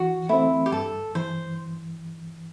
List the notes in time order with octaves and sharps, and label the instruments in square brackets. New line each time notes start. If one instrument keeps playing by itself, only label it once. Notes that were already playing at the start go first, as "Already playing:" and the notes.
Already playing: [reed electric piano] E3 [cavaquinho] F#4
[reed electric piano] A3 C4 [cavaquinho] E4
[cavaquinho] G4
[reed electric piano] G2 [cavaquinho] A4
[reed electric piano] E3 [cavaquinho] C5